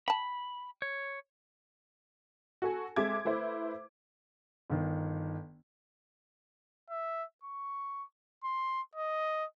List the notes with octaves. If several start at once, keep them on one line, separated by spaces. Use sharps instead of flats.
G5 A5 B5
C#5
F#4 A4 G#5
G#3 C4 A4 E5 D6 G#6
A3 E4 B4 C5
G1 D#3
E5
C#6
C6
D#5